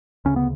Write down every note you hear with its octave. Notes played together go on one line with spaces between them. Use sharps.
D2 C#3 C#4
B3